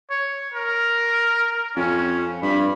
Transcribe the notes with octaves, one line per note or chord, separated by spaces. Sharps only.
C#5
A#4
F2 C#4
G2 B5